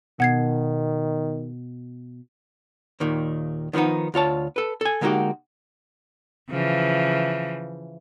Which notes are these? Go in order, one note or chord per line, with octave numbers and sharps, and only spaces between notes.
B2 D#3 F#5 G#6 C7
D#2 A#2 D#3
D#3 F3 A3 B3 D#4
D2 F4 C#5 A5
A4 B4
A4 G#5
D3 G#3 A#3 D#4 F#4 G4
C#3 E3 F3